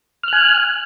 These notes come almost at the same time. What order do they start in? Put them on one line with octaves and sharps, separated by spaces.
F6 F#6 G#5